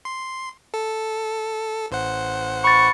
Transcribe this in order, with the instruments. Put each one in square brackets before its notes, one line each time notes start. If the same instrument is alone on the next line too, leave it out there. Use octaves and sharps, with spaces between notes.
[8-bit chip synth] C6
A4
A1 C5 F#5
[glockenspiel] B5 A6 [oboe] C#6